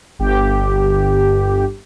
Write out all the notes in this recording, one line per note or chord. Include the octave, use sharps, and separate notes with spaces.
G1 G4